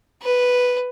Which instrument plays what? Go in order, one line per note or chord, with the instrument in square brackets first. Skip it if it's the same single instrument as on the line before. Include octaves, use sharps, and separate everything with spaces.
[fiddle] B4